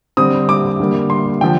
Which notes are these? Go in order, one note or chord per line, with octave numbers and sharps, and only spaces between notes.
D3 G3 C4 D#6
D6
D3 G3 A#3
C6
D3 F3 G5